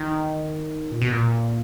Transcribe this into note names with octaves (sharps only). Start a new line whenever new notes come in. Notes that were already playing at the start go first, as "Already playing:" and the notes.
Already playing: D#3
A#2
B2
A#2